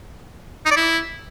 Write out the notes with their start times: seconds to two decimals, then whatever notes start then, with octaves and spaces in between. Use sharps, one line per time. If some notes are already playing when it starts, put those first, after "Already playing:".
0.66 D#4
0.71 D5
0.77 E4